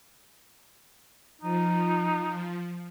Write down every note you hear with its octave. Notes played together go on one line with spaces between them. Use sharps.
F3 D#4